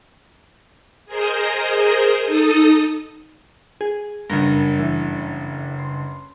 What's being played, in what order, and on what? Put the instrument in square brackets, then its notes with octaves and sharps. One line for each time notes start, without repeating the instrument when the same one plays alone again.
[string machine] G#4 A#4 C5 D#5
D#4 A4 D#6
[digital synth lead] G#4
[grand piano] F#1 G2 [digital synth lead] A#4
[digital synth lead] E3
C6